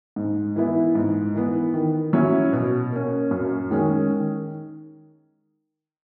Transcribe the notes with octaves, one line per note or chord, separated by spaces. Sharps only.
G#2
E3 B3 E4
G#2
E3 B3
D#3
F#3 C#4 E4
B2
A#3 C#4
F#2
D#3 G#3 C#4
D#3